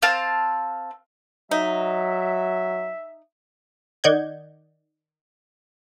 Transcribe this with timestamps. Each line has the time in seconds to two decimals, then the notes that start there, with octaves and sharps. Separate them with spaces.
0.02 C4 F5 A5
1.51 F#3 D#4 E5
4.04 D#3 D5 D#5 F#5 G6 G#6